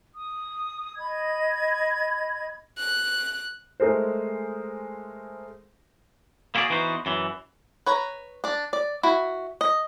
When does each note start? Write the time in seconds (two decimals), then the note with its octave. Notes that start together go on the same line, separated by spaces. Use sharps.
0.12 D#6
0.97 D#5 B5 G#6
2.78 F#6
3.80 G#3 A3 G#4 A#4 C5
6.55 A#3 E4 F#4 G#4 D5
6.70 E3 B3 D#4 F#4 C5
7.06 F#2 E3
7.86 B4 C#5 A#5
8.44 D4 D5
8.73 D5
9.03 E4 F#4
9.61 D#5